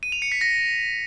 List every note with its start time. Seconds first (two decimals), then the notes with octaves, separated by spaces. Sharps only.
0.03 D#7
0.12 F7
0.22 C#7
0.32 B6
0.41 A#6